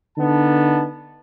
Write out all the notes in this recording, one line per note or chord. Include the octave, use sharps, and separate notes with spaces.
D3 B3 D4 D#4 A5